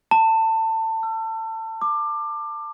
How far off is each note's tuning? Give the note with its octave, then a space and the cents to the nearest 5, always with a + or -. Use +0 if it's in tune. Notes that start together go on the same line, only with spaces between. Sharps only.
A5 +25
E6 +35
D6 +20